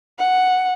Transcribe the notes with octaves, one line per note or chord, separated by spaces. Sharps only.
F#5